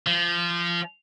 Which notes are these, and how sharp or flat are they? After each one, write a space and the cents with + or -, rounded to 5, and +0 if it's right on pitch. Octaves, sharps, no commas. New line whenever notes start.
F3 -20